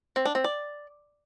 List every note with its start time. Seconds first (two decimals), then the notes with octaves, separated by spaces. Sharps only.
0.16 C4
0.25 D4
0.35 C4
0.44 D5